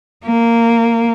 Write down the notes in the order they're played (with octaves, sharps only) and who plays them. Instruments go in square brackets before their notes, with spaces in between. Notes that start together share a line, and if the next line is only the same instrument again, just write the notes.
[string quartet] A#3